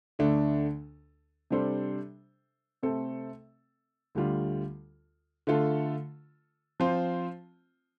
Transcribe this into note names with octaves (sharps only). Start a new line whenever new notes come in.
D2 D3 A3 D4
C3 G3 D4 A4 C5
C3 A3 C4 A4
D2 D3 G3 F4
D3 A3 F4 A4
F3 C4 F4 C5